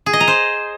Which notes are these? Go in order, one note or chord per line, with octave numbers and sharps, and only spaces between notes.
G#4
D#5
A#5
C5